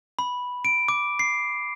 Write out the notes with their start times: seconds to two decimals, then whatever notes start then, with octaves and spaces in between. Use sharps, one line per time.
0.19 B5
0.65 D7
0.88 D6
1.19 C7